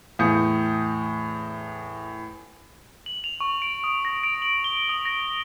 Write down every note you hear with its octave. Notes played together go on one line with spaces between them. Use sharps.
E2 A2 D#6 G6 C#7
F#7
F7
C#6
D7
D#6
A#6
D7
F#7
G7
D#6
A#6